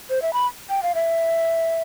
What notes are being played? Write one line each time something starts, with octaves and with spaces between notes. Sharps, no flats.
C5
E5
B5
G5
F5
E5